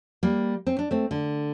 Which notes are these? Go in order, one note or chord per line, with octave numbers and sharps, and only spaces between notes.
G3 A#3
C4
D4
A3 C4
D3